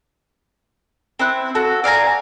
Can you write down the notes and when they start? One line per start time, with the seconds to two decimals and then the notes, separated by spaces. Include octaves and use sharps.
1.19 C4 E4 F#6
1.55 F#4 A4
1.84 D5 F5 G#5 A#5